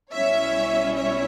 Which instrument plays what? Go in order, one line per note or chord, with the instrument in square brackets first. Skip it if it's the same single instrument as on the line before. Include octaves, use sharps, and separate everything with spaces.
[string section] B1 B2 G3 C#4 E4 C#5 E5
C#5 E5